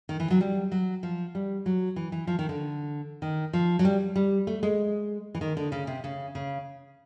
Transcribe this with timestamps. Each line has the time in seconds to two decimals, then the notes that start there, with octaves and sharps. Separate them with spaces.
0.09 D#3
0.20 E3
0.30 F#3
0.41 G3
0.72 F#3
1.03 F3
1.35 G3
1.66 F#3
1.96 E3
2.12 E3
2.27 F3
2.39 D#3
2.49 D3
3.22 D#3
3.53 F3
3.79 F#3
3.85 G3
4.16 G3
4.47 A3
4.63 G#3
5.35 E3
5.41 D#3
5.57 D3
5.72 C#3
5.87 C3
6.04 C#3
6.35 C#3